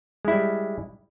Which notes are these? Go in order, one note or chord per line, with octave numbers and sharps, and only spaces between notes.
G3 G#3 E4